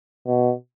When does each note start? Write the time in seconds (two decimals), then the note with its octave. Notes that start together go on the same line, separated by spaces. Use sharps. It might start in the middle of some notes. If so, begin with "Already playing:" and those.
0.27 B2